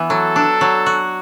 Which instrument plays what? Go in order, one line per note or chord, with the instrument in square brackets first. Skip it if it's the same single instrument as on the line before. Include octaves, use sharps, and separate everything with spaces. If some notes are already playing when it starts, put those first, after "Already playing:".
Already playing: [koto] E3 B3
[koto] F#3 [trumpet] A4
[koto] D4
F#3
F#4